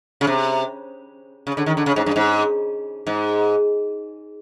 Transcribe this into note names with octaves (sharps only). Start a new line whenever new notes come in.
C#3
C3
C#3
D3
D#3
D3
C#3
G#2
G2
G#2
G#2